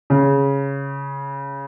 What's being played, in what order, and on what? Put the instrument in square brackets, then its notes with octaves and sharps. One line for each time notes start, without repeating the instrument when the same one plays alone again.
[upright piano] C#3